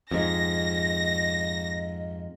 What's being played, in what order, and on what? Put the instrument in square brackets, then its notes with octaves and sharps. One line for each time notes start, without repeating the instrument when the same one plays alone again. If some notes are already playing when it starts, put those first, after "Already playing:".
[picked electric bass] F2 G#2 [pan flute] D#5 [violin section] A#6